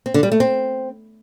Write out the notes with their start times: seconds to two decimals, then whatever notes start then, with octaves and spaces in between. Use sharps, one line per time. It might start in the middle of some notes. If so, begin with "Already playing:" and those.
0.06 C4
0.14 D3
0.23 G3
0.32 A3
0.40 C4